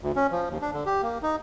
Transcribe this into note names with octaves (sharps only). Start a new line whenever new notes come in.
D2
C#4
F3
D#2
D4
D3
G4
A#3
D#4